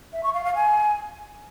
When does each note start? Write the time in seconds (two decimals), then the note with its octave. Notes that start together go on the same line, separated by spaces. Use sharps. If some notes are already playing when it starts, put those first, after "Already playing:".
0.13 E5
0.23 C#6
0.34 F5
0.44 F5
0.55 G#5